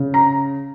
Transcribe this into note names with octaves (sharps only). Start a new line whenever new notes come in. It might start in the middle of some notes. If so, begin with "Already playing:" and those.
Already playing: C#3
A#5